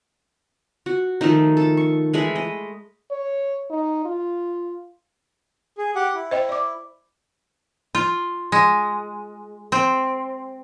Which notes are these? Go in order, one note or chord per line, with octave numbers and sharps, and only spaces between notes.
F#4
D#3 F3 A3 D#4
A4 A5
C#6
E3 G#3 A3 B5
D#5
C#5
D#4
F4
G#4
G4 F#5
E4
C5 D#5 G5
D5 D6
F4
G#3
C4